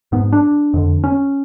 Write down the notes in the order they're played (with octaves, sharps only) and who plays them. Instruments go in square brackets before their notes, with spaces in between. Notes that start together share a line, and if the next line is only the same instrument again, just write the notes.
[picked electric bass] G#2 B3
D4
F2 D3
C#4